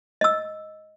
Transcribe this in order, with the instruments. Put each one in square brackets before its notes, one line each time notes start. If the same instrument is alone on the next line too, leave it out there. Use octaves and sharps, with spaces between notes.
[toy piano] D#5 E6